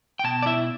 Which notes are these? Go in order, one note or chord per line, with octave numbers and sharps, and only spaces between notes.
G5
B2 A5
D5
E4 E5